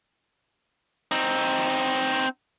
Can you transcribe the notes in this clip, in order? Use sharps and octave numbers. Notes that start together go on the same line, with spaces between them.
C4 D#4